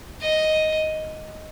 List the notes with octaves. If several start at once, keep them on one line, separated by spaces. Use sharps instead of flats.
D#5